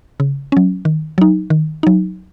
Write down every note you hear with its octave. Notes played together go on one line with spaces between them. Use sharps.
C#3
F#3 C#4
D#3
F#3 D#4
D#3
F#3 D#4